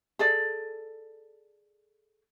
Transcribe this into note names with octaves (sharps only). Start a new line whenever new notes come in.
G#4 A4 D5